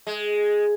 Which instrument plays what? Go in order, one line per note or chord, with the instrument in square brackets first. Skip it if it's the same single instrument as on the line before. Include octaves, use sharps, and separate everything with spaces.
[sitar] G#3